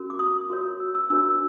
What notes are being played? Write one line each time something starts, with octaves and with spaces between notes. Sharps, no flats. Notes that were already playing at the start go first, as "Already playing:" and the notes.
Already playing: C#4 F#4 A#4
D6
D#6
F#4 A#4 C#5
E6
E6
D4 F#4 A#4 C#5 E6